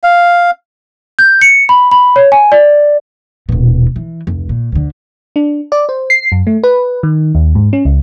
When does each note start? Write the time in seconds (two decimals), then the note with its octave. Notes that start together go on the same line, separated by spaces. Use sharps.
0.03 F5
1.19 G6
1.41 C#7
1.69 B5
1.91 B5
2.16 C#5
2.32 G#5
2.52 D5
3.49 D#1 B2
3.96 E3
4.27 F1 C#2
4.49 A#2
4.72 D2 D3
5.36 D4
5.72 D5
5.89 C5
6.10 C7
6.32 F#2
6.47 A3
6.63 B4
7.03 D#3
7.35 D#2
7.55 G#2
7.73 C#4
7.85 C#2